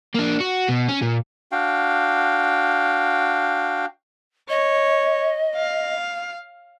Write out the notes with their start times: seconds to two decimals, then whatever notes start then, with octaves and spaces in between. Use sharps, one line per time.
0.15 A#3 D4
0.40 F#4
0.69 B2
0.88 C#4
1.02 A#2
1.52 D4 F#4 F5 G5
4.49 C#5 D#5
5.56 F5